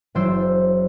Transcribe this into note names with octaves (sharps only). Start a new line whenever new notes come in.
F#1 E3 F#3 C5 D5 E6